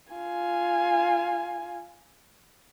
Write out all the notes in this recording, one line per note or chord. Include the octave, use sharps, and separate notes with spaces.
F4 G#5